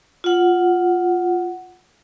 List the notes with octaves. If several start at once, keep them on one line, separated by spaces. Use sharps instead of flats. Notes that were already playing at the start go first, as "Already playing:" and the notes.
F4 F#5